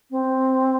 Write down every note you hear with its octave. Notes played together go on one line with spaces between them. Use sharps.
C4